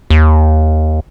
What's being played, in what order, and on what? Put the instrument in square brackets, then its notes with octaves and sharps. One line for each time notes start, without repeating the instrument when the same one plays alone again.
[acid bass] D#2